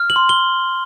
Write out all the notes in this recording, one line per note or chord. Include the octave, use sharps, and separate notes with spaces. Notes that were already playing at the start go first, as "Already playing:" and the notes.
Already playing: F6
F#7
C6
G7